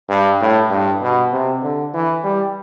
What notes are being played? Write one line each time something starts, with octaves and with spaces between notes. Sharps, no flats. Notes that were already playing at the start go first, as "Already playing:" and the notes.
G2
A2
G2
B2
C3
D3
E3
G3